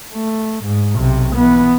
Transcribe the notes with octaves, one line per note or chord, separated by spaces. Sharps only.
A3
G#2
B1 C3
E3 B3